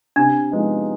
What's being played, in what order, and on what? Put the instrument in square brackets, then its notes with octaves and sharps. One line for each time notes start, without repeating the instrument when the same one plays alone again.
[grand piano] C3 [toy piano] D4
[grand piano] F3 G#3 B3 D#4